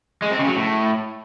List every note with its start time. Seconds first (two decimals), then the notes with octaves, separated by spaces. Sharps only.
0.22 G#3
0.30 C4
0.39 C#3
0.47 F#3
0.56 A2